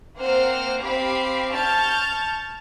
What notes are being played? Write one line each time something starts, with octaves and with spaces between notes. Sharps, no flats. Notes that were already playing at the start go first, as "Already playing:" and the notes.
A#3 C4 C5 F#5 F6
C4 G4 F5 B5 C7
A5 C#6 F6 G6 A6